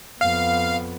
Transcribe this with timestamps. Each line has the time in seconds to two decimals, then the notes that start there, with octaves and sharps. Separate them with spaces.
0.21 F2 B3 F5